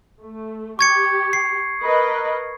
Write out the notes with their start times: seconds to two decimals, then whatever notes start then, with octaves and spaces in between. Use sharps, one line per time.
0.21 A3
0.79 G4 C#6 G#6 C#7
1.33 C7
1.81 A#4 B4 D#5